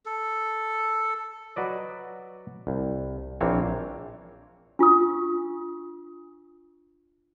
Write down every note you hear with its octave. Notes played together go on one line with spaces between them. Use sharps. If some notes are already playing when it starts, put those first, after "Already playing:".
A4
F#3 F#4 B4 D5 D#5
C2
A#1 E3 A#3 C4 D4 C#5
D4 F4 C#6 D#6